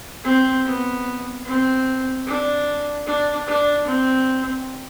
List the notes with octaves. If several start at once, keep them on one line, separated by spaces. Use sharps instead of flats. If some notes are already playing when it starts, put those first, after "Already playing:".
C4
B3
C4
D4
D4
D4
C4